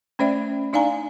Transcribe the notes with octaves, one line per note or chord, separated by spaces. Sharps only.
A3 C#4 C5 D5 E5
D4 D#4 D5 F5 G#5 A#5